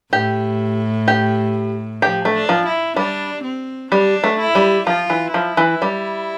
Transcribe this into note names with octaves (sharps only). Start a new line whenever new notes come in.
A2 G4
G4
F3 G4
A3
D4
F3
E4
G3 D4
C4
G3 D4
A3
E4
G3
F3 F4
E3
F3 E4
E3
G3